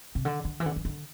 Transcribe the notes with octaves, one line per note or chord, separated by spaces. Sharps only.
C3
D3
D3
E3
D3
E3
D3